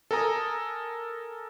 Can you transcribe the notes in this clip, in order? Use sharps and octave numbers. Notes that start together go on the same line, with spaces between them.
A4 A#4 G#5 A#5 D#6